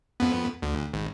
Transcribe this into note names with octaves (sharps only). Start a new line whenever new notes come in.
F2 B3
D2
G#1